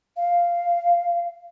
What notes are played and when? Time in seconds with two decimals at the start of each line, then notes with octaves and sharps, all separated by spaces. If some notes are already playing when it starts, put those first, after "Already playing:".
0.17 F5